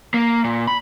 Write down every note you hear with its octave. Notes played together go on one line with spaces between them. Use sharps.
A#3
A#2
B5